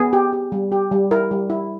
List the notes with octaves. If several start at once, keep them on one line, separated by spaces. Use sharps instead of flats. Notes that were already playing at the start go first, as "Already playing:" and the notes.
Already playing: B3 G#4
G4
G4
G3
G4
G3
E4 A#4
G3
E4